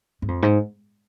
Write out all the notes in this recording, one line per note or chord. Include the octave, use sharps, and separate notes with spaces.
G#2
F2
G#2